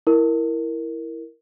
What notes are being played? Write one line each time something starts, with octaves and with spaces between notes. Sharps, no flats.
E4 A#4